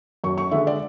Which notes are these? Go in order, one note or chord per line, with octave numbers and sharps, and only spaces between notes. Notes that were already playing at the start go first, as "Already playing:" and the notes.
F#2 C#6
C#6
D3 G#3 E5
D5